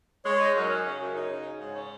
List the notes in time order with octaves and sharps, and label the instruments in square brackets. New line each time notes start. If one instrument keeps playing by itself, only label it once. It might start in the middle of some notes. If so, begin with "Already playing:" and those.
[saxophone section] G#3 [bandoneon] C#5
[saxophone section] D#4
F#2
C#4
C#3
F#2
D#4
C#3
C#3
G#2
C#4